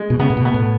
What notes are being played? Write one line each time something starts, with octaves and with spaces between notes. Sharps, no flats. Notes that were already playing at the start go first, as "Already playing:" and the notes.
Already playing: G#3
B2
C#3 B3
A2
B2
B3
A2